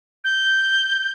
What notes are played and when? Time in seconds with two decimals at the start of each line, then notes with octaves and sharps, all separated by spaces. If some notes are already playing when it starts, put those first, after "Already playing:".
0.24 G6